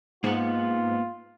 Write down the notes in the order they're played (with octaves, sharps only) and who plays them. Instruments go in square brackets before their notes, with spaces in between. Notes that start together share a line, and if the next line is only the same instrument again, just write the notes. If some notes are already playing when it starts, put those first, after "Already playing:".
[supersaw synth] G#2 [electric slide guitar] A#3 B3 F#5 [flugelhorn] F4